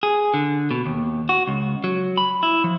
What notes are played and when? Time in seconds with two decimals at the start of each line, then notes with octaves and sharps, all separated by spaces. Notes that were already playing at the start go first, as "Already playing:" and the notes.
0.03 G#4
0.34 D3
0.71 B2
0.86 D#2
1.29 F#4
1.48 C#2
1.84 F#3
2.17 B5
2.43 E4
2.64 F3